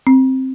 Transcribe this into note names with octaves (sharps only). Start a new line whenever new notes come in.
C4